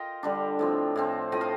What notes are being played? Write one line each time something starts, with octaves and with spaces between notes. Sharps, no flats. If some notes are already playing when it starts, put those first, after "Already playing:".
Already playing: F4 A#4 D#5 F5 G5
D3 G3 D4
A2 F3 C4
A2 F3 C4
A2 F3 C4 D#5 G5
F5 A5